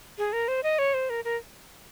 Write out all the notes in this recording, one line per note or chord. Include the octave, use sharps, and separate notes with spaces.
G#4
A#4
C5
D#5
C#5
C5
A#4
A#4